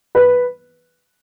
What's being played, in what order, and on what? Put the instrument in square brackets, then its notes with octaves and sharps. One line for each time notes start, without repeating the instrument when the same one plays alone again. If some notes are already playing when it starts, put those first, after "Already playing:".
[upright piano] B4